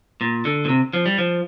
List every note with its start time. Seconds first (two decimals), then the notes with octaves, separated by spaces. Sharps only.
0.21 A#2
0.45 D3
0.65 A#2
0.69 C3
0.93 F3
1.06 G3
1.18 F3